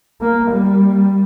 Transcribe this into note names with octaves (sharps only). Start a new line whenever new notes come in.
A#3
G3